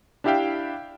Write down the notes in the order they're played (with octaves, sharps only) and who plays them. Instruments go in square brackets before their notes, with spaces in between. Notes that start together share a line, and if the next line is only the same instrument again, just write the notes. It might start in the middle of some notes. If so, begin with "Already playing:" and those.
[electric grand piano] D4 E4 G4 E5 F5 G5